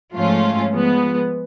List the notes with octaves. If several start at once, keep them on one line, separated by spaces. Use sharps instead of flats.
G#2 F3 A3 C#4 F4
F3 G#3 B3